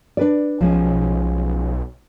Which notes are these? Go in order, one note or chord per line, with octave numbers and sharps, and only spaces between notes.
D4 B4 D5
B1 F3 G#3 C#4